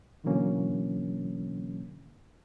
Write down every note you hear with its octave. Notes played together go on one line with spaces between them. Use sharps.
B2 D3 E3 F#3 A#3 C#4